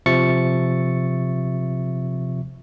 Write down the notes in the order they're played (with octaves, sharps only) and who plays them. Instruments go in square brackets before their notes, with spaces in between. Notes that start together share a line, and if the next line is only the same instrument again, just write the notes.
[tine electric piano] C3 F3 E5 C#6 A6 C#7